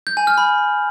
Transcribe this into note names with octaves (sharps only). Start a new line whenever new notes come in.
G6
G#5
F6
B5